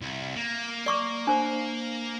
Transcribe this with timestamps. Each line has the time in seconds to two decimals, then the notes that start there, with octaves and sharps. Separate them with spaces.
0.01 C2
0.36 A#3
0.86 D5 C#6 D6
1.27 D4 C5